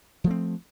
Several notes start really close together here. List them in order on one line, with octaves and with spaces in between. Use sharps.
F3 A3 C4